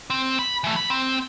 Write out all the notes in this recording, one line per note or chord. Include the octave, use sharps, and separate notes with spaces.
C4
B5
E3 A3
D2 B5
C4